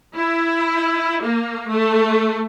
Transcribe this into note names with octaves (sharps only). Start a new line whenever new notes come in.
E4
A#3
A3